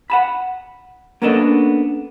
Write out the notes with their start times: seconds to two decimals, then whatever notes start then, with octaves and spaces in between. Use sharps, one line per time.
0.10 F#5 A5 B5
1.22 A#3 B3 C#4 D4 A4 D#5